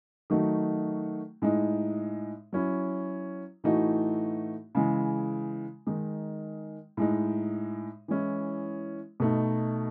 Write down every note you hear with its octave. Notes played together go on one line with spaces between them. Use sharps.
D#3 F#3 A3 D#4 F#4
A2 G#3 D#4
F#3 C#4 E4
A2 E3 A3 D#4 F#4
C#3 E3 G#3
D#3 G#3 D#4
A2 G#3 D#4
E3 G#3 C#4 E4
B2 A3 D#4